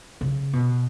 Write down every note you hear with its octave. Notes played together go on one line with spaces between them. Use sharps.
C#3
B2